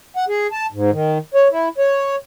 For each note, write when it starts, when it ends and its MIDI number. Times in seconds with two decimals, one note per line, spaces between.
0.17 0.25 78
0.29 0.47 68
0.52 0.66 81
0.72 0.91 44
0.91 1.18 51
1.34 1.48 73
1.51 1.69 64
1.78 2.16 73